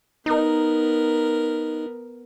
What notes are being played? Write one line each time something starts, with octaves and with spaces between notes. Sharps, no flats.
B3 D#4 A#4